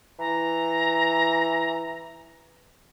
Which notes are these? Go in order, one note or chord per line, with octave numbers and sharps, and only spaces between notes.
E3 A#5